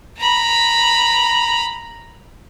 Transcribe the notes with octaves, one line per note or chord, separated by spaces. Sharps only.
A#5 B5